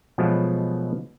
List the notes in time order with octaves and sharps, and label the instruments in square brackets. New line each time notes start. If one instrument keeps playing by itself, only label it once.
[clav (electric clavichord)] B2 F3 F#3 G#3 A3 B3